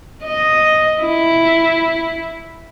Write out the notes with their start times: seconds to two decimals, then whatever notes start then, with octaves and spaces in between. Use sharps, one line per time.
0.25 D#5
1.02 E4